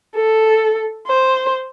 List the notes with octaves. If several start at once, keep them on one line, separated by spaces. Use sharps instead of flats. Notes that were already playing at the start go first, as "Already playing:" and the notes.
A4
C5